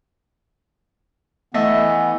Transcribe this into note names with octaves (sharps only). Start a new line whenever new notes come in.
E3 A3 B3 D#5 E5